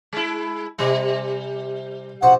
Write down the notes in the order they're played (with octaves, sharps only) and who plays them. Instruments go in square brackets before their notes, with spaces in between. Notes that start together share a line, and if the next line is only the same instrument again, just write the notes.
[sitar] G#3 E4
[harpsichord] C3 E4 [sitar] G3
[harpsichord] A#1 F#4 C5 [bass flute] F#5